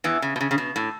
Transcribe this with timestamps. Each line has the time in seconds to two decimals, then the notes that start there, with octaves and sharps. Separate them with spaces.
0.04 E2 E3
0.22 C#3
0.36 B2
0.41 C#3
0.51 C#3
0.58 B2
0.76 A2